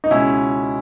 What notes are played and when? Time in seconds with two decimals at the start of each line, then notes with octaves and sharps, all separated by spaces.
0.04 D#4
0.11 C#2 B2 G#3 C#4 E4